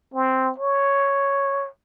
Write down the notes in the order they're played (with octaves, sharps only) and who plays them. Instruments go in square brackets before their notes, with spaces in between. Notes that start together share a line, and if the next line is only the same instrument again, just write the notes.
[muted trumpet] C4
C#5